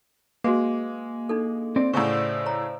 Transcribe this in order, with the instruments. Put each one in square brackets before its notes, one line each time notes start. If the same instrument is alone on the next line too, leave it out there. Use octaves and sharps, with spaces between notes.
[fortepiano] G#3 [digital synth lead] A#3 [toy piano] F#4 B4
[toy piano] D4 D#4 A4
[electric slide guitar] C4 D5
[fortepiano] A2 C#3 [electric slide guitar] C5 D5 [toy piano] F#5 G#5 C#6
[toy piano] C#5 A#5